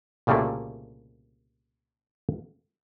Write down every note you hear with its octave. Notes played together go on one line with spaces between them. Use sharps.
C2 A#2 C#3 G3 A3 A#3